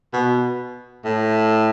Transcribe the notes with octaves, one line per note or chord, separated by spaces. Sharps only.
B2
A2